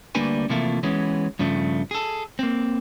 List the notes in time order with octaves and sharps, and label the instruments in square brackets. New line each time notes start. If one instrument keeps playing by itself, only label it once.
[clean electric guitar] D2 G3 A#3 D4 B4 G#5
C3 E3 F3 A3 A#3 F4
E3 G#3 B3 C#4
G2 C#3 F3 A3
G#4 A4
A#3 C4